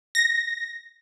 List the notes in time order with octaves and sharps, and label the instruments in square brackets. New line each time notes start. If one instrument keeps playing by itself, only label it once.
[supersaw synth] A#6